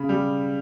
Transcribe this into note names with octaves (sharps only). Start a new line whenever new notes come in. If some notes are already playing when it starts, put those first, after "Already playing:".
Already playing: C#3 B5
G3